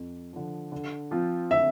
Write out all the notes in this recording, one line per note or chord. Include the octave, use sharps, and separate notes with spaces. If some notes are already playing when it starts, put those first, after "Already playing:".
Already playing: F2
D3 F3
D3
F3 C4 F4
D3 E5